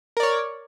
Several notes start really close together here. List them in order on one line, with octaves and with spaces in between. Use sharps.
A#4 D5 C#5